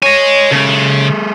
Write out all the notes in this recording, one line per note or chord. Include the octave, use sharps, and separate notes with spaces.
C#5 D#5 G#5
C#3 G#3 A4